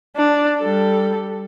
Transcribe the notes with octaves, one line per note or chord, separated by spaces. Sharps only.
D4
G3 A4